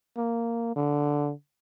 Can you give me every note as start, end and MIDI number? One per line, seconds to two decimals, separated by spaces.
0.17 0.72 58
0.76 1.31 50